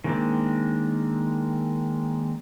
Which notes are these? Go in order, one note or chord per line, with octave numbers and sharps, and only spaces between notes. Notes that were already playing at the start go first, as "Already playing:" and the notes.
D#3 G#3 A#3 C4 D4